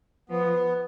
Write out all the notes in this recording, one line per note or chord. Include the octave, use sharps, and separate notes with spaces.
F3 B3